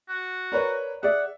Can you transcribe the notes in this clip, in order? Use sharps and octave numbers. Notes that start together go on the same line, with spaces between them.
F#4
A#4 B4 C#5 D5 A#5
G#4 D5 E5 F#5